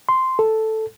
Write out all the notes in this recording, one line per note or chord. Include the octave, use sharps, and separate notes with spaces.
C6
A4